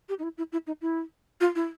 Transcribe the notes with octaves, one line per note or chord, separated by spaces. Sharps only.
G4
D#4
E4
E4
E4
D#4
E4
F4
E4